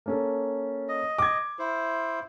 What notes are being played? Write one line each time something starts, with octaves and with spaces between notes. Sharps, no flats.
A#3 C#4 A4
D#5
D6 G#6
E4 C5